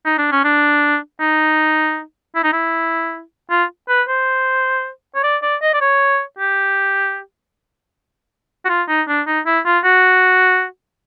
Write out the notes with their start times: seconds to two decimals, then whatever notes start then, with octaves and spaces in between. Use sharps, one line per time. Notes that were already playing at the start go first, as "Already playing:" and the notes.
0.05 D#4
0.18 D4
0.32 C#4
0.44 D4
1.20 D#4
2.35 E4
2.44 D#4
2.53 E4
3.50 F4
3.89 B4
4.08 C5
5.15 C#5
5.23 D5
5.42 D5
5.62 D#5
5.74 D5
5.81 C#5
6.39 G4
8.65 F#4
8.69 F4
8.88 D#4
9.08 D4
9.27 D#4
9.46 E4
9.65 F4
9.84 F#4